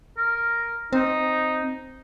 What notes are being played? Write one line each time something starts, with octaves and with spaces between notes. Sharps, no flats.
A#4
C4 D#4